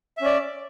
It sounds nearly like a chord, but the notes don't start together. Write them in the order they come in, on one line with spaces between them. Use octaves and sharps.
E5 C#4 D5